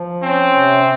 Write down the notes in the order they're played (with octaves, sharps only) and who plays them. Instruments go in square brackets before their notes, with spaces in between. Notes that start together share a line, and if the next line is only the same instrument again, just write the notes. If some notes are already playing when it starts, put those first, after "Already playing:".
Already playing: [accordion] F3
[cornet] C4 [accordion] C#4
[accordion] C3